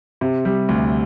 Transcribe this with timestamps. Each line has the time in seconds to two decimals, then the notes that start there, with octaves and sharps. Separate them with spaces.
0.21 C3
0.45 G3
0.69 D2